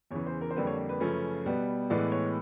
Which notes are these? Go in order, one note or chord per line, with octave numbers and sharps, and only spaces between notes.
E2 C#3 E3 C#5
C5
A#4
C5
F2 D3 G3 A#3 B4
C#5
B4
F#2 C#3 F3 A3 C#4
B2 G3 B3
A2 E3 G#3 B3 D5
C#5